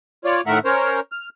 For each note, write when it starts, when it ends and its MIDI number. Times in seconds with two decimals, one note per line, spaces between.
0.25 0.41 65
0.25 0.41 73
0.25 0.41 74
0.47 0.59 45
0.47 0.59 51
0.47 0.59 57
0.47 0.59 70
0.47 0.59 76
0.47 0.59 78
0.65 1.00 61
0.65 1.00 70
0.65 1.00 72
0.65 1.00 73
1.12 1.29 89